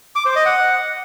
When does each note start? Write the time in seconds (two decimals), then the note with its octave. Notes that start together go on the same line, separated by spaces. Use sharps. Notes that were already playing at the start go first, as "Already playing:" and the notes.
0.16 D6
0.26 C5
0.36 D#5
0.45 F#5